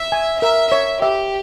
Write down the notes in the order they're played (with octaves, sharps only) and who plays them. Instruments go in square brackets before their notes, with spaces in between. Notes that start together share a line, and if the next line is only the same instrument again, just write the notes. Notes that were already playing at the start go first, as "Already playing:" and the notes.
Already playing: [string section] E5
[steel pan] G#5
[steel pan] A#4 [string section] E5
[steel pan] C#5 [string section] E5
[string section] G4 [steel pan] E5